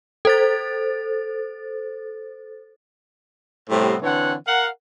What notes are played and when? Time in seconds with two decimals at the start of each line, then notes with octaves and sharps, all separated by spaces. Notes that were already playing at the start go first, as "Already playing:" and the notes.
0.25 A4 C5 A6
3.70 A2 C3 G3 B3 C4
4.03 D3 E3 C4 C#5 F#5
4.47 A#4 F5 F#5